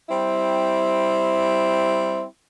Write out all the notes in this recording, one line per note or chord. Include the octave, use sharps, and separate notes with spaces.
G3 C4 E4